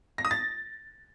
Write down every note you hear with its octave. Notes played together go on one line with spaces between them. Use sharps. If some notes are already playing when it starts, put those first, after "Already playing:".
A#6
D#6
A6